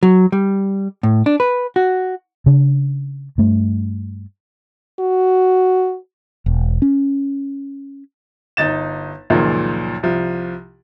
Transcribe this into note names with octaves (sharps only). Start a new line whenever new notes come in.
F#3
G3
A2
D4
B4
F#4
C#3 D4
G2 A3
F#4
E1
C#4
G1 D#4 A6 E7
C#2 F#2 A#2 D#3 F3
C2 F3